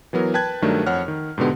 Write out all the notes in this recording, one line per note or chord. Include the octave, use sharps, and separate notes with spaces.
E3 F#3 B3 A#4
B4 G5 A5 F#6 G#6
G2 D#3 F#3 A3 D4 A#4
F2 C#5 F#5 F6
D#3
G#2 B2 D3 B3 G4